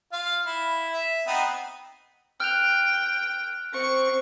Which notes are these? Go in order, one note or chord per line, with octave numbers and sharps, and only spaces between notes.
F4 F5
E4
E5
B3 C4 D#4
G5 F6 F#6 F7
C4 C#6